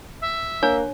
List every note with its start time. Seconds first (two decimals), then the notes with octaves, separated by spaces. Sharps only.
0.21 E5
0.63 A#3 D4 C#5